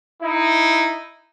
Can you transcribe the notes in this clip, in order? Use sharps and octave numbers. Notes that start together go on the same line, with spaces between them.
D#4 E4